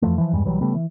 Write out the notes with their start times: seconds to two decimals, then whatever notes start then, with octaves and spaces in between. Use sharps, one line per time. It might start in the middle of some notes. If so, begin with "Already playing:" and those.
0.02 F2 E3 F3 A3
0.18 E3 F3
0.33 E2 G2 G3 G#3
0.44 B1 E3 F#3 G3
0.61 C#3 G3 A3 B3
0.75 E3